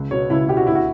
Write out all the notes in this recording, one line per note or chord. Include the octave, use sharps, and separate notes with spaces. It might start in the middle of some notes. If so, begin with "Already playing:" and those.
Already playing: C#2
B2 C#5
C#2 E4
B2 G4
F#4
D2 E4
F#4